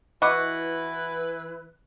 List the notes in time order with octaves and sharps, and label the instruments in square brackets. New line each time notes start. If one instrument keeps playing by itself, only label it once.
[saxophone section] E3 E4 B4 [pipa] F#4 [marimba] D#5 B5 D6